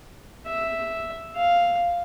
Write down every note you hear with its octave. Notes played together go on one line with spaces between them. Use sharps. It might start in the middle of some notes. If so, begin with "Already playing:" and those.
E5
F5